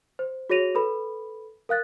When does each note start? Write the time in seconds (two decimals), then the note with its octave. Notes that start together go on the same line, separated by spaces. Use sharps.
0.19 C5
0.50 F#4 G#4 C#5 A#6 D#7 F7
0.75 A4 B4 B5
1.69 A#4 F5 F#6 A6